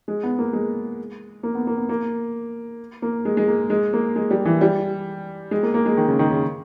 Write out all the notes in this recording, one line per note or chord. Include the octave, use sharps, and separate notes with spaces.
G#3
B3
A#3
G#3
A#3
B3
A#3
B3
A#3
A#3
G#3
G#3
A#3
G#3
A#3
G#3
G3
E3
G3
G#3
A#3
A#3
G#3
D#3
C#3
D#3
C#3